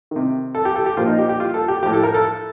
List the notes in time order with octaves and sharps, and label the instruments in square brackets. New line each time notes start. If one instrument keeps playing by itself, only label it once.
[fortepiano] C3 D#3
A4
G4
A4
G4
A#2 F3 F4
D#4
G4
G4
F4
A4
G4
A2 F3 G4
A4
A#4
A4